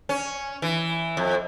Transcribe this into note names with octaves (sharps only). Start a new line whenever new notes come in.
C#4
E3
F2